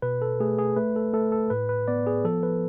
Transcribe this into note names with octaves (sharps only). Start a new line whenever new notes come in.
B2 B4
A4
A3 G#4
G#4
A3 B4
A4
A3 A4
A4
A2 B4
B4
B3 D5
G#4
F3 A4
B4